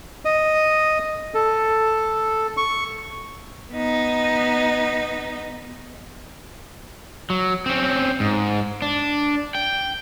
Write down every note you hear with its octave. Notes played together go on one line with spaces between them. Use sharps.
D#5
A4
C#6
B3 D#4
F#3
C4 C#4
G#2
D4
G5